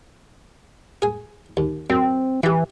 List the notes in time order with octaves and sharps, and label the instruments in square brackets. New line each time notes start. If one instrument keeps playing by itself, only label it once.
[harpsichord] G#4 G#5
D#2
[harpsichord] F#2 [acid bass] C4
[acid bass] E3 [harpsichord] E4 G4